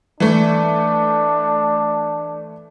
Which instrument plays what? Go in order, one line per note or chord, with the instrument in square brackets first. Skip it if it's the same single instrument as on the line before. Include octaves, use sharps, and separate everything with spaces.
[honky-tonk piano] E3 A3 [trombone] D4